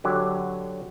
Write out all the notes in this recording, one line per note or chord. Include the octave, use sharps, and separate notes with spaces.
D3 F#3 G4